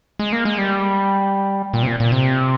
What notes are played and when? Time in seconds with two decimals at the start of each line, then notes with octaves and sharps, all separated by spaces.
0.19 G#3
0.33 A#3
0.45 G#3
0.58 G3
1.73 A#2
1.83 C3
1.87 A#2
2.00 A#2
2.12 C3